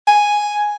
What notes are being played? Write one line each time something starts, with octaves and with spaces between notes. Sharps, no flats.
G#5